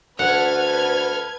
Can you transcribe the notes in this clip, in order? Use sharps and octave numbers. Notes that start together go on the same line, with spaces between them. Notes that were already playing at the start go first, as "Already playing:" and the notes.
D2 A4 B4 F#5 F6 G#6